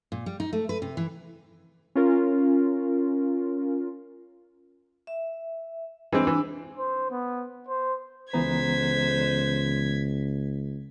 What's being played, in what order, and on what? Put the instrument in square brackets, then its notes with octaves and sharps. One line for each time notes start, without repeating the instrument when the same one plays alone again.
[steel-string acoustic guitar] A#2
G3
D#4
A3
B4
C3
E3
[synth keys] C#4 F4 A#4
[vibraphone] E5
[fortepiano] E3 G#3 C4 [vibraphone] D4
[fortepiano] E3
[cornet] C5
B3
C5
[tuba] C#2 [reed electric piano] E3 B3 A#5 [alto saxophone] C5 [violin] G#6 B6